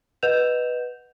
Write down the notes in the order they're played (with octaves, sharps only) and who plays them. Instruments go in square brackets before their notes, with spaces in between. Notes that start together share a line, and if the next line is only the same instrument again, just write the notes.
[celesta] B4 D#5 F#5 G6 E7 F7